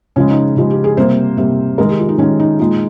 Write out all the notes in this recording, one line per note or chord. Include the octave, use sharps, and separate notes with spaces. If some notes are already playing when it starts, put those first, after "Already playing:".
C#3 F3 G#3 C#4
D#4
C#3 F3 G#3 G4
G4
G#4
C3 G3 A#3 C5
C3 G3 A#3
D#3 G#3 A#4
G4
F4
D#4
D#3 G#3 C#4
D#4
A#2 G#3 D#4